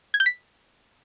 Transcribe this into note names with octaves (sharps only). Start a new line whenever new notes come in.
G#6
G6
B6